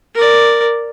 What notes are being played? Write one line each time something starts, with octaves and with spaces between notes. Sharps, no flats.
A#4 D5